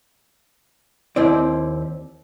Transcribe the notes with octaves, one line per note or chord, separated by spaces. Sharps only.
D#2 C4 E4 D5